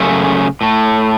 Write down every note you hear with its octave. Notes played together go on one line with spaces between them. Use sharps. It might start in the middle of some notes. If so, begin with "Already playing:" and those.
Already playing: F#2 C#3 A3
A2 A3